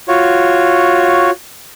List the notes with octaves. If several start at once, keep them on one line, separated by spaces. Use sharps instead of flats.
F4 F#4 C#5